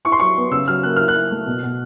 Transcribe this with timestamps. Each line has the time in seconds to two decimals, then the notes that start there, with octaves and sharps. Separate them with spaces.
0.05 E4 C#6
0.12 C6
0.20 F#3 C#6
0.37 B3
0.51 C#3 E6
0.68 F#3 F6
0.83 A#3 F#6
0.96 E4 F6
1.08 F#6
1.15 E4
1.31 A3
1.46 B2
1.63 B2